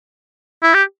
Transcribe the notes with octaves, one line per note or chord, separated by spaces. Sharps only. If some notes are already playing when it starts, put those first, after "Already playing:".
E4
G4